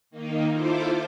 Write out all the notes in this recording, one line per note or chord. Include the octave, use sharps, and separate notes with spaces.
D#3 A#3 D#4
E4 F4 A4 C5 D6